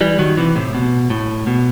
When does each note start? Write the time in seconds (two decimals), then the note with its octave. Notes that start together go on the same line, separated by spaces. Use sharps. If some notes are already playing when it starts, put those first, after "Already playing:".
0.01 E3 G3
0.19 D#3 F#3
0.37 C3 E3
0.55 A2 C3
0.75 B2
1.10 A2
1.47 B2